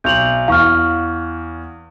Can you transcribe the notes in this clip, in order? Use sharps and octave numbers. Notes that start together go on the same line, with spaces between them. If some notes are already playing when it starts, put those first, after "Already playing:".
B1 G6 F7 F#7
E2 F5 C#6 F6